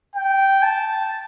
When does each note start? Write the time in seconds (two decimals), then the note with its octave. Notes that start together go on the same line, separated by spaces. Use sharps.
0.16 G5
0.63 A5